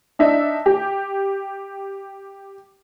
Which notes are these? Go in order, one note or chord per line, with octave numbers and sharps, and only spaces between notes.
D4 D#4 E5
G4